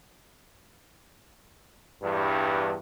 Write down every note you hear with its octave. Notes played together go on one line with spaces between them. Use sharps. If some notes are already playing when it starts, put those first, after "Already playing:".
E2 G2